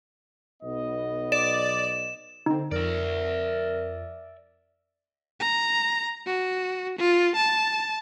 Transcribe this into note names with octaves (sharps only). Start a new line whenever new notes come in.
B1 B3 D#5
D5 E7
D3 C4 D#4
F2 A#4 D5 E5
A#5
F#4
F4
A5